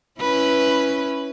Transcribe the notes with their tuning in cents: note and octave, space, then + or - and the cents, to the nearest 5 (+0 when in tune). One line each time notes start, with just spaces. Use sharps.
C#4 +0 E4 +0 B4 +0